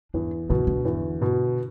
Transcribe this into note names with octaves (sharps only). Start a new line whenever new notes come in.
E2 D4
B2 D3
D3
E2
B2